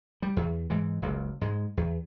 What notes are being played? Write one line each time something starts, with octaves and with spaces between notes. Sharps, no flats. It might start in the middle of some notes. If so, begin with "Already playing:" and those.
G3
E2
G#2 E3 G#3
F#1 C#2 F#2
G#2 G#3
E2